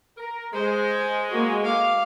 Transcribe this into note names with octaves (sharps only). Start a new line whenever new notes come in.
A#4
G#3 C5
A#3 F#4
F5 D6